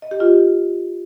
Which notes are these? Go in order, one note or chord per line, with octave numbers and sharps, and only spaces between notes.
D#5
G4
F4